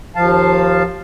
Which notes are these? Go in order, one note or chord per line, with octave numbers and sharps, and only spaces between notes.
D#2 F3 F5 A5